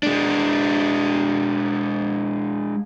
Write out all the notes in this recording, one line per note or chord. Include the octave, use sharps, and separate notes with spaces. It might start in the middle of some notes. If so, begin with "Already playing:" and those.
G#3 D4